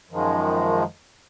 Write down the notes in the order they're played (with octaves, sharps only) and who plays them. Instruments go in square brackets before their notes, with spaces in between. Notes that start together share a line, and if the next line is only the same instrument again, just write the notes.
[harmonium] F#2 D#3 F3 G#3